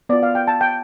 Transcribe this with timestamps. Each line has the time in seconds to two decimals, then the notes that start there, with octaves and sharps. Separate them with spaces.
0.09 B3 D5
0.13 F4
0.23 F5
0.35 G5
0.47 A5
0.61 G5